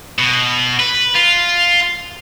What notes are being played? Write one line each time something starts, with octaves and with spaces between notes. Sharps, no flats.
B2
B4
F4